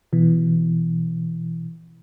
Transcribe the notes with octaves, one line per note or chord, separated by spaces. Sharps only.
B2 E3